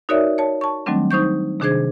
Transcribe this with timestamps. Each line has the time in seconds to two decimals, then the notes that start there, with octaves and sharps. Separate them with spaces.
0.09 D#4 F#4 A#4 C#5 D5 E5
0.38 C#5 A5
0.61 A5 C#6
0.86 D#3 F#3 G3 A3 C4 D4
1.11 D#4 C5 C#6 G6
1.60 C3 D#3 D4 G#4 C5 G#6